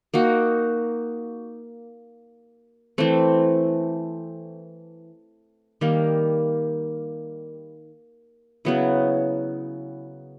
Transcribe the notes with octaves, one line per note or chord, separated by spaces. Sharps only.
A#3 D#4 F#4
E3 A3 C4
D#3 G3 A#3
C#3 F#3 B3 E4